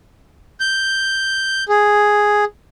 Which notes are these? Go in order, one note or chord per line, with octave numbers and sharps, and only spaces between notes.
G6
G#4